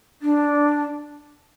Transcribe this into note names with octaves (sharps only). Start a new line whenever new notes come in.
D4